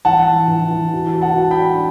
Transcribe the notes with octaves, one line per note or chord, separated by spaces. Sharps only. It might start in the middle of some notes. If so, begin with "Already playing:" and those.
E3 F#5 A5
E3
E3
E3
F#4
F#4
F#5 A5
F#4
G5 B5
D4